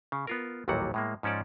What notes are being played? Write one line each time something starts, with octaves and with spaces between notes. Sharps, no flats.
C#3
B3 F4 A#4
A1 D#2 A#2 F#3 G3 F#5
A2 G#3 A#3
G#2 F3 C#4 A4 D5